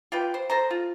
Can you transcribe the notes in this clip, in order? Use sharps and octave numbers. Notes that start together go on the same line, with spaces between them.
F4 G4 B4 G5
C5
A4 C5 A#5
F4